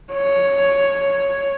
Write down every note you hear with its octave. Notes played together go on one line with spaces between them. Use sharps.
C#5